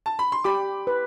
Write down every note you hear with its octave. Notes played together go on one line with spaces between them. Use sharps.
A5
B5
C6
G4 B5 D6
B4